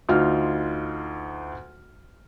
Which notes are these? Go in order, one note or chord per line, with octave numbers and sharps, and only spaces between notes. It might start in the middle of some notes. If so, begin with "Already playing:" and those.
D2 D#4 F4 F6